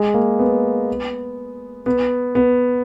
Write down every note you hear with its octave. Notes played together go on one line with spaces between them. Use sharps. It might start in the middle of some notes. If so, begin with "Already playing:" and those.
Already playing: G#3
A#3
B3
B3
B3